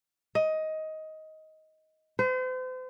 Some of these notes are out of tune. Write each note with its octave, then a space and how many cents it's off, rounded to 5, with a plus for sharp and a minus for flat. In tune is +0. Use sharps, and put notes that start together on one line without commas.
D#5 +15
C5 -40